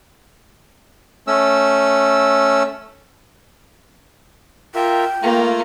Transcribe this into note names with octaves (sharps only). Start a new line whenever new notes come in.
A3 C#4 E6
F4 A#4 E5 G5
A3 A#3 F4 A#5